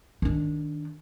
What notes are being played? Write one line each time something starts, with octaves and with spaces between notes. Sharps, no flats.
D#3 D4